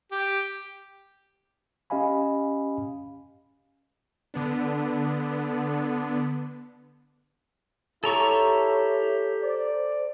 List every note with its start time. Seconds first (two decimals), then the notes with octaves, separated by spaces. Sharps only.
0.12 G4
1.90 C#4 G4 D#5 F5 G#5 B5
4.34 D3 B3 D4
8.04 E4 G4 A4 C#5 A#5 C#6
9.42 C5 D5